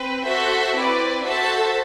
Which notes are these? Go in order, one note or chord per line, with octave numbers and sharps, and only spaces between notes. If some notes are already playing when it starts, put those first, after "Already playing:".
Already playing: C4 B4
F#4 A4 C5 E5
C4 E4 B4 D5
F#4 A4 C5 E5 A5